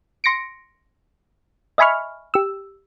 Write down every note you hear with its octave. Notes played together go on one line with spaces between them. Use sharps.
C6 A#6 C#7 D7
D#5 E5 G#5 B5 C#6 F6
G4 E6